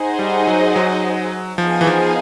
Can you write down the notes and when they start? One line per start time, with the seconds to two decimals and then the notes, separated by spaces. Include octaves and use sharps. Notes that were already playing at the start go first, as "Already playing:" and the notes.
Already playing: D#4 G#4 C5 D#5 F#5
0.19 G3
0.47 F#3
0.76 F#3
1.58 F3 B3 D#4 G#4 C5 F5
1.81 E3
1.87 F3